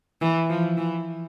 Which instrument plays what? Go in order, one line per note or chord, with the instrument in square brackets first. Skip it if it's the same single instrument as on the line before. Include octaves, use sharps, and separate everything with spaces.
[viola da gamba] E3
F3
E3